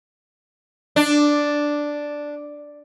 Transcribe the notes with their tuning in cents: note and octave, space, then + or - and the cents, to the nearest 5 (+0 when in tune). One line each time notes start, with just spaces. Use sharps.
D4 +0